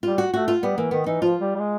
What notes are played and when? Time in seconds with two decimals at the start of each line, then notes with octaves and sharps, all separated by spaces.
0.03 G3 F4
0.18 F#4
0.33 A3 F#4
0.48 F4
0.63 G3 B3
0.78 E3 A#3
0.91 D#3 B3
1.06 E3 D#4
1.21 F3 F4
1.41 G3
1.56 G3
1.60 G#3